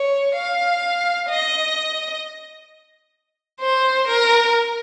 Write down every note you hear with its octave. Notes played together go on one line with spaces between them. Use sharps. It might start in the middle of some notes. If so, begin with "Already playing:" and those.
Already playing: C#5
F5
D#5
C5
A#4